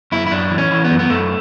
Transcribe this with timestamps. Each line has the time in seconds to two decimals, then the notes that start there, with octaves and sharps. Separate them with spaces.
0.12 F#2 E4
0.27 E4
0.31 F#2 D4
0.51 E3
0.58 C#4
0.71 E3
0.84 B3
0.90 F#2
0.99 B3
1.10 F#2 A3